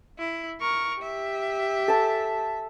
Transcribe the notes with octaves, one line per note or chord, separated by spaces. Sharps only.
E4
A#4 C#6
G4 E5
A4 A5